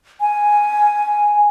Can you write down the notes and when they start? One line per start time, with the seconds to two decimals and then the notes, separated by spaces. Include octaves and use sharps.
0.21 G#5